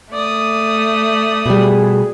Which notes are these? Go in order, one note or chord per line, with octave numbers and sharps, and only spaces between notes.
A3 D5 D#6
B2 G3 G#4